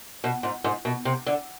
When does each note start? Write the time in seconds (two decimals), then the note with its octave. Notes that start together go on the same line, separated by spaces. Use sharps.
0.24 B2
0.43 G#2
0.64 G#2
0.85 B2
1.05 C3
1.27 D3